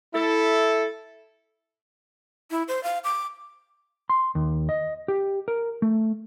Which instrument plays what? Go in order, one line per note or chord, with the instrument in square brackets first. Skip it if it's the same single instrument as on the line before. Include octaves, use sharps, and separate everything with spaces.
[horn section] E4 A4
[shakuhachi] E4
C5
F5
D6
[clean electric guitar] C6
D#2
D#5
G4
A#4
A3